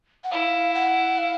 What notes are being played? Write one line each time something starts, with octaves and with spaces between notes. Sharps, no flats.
F#5
E4 F5
F#5
F5